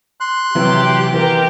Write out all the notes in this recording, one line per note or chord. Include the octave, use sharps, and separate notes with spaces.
C6 F#6
C3 E3 F#3 G4
E3 B3 G4 A#4